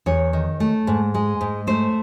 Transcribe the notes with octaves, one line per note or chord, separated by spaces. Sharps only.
E2 C#5
D#3
A3
G#2
G#3
G#2
A3 C5